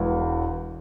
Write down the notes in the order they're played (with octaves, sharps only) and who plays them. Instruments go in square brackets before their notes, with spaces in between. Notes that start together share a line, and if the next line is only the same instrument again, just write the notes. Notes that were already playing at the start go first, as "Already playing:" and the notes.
Already playing: [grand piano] E1 E2 E3